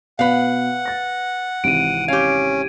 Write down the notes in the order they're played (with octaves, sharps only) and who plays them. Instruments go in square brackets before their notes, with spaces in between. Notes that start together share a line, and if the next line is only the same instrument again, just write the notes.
[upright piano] B2 B3 [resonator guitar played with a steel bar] B4 F5 [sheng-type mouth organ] F#5
[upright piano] A6 A#6
[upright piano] G#1 C3 E3 [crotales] D7 D#7
[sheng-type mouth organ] C#4 [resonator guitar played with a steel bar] G4 F5 [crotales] G#6